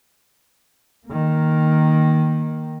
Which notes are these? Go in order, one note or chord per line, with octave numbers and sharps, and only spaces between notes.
D#3 A#3